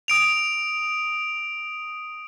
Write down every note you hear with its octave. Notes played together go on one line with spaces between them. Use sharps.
D#6 D7 F7